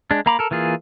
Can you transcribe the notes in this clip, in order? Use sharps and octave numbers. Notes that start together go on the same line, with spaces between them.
G#3 D4
A#3 F5 A#5 B5 D6
A4 A#4
E3 A#3 F4 G#4